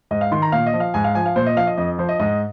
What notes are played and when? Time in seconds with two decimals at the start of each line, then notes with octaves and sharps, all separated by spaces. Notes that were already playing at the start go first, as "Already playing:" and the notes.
0.11 G#2 D#5
0.21 F5
0.32 D#3 C6
0.42 A#5
0.52 A#2 F5
0.66 D#5
0.74 F3
0.80 F5
0.94 G#2 G#5
1.04 F5
1.15 F3 G#5
1.26 F5
1.36 A#2 C5
1.47 D#5
1.57 F3 F5
1.67 D#5
1.78 F2 D#5
1.99 F3 C5
2.09 D#5
2.20 G#2 D#5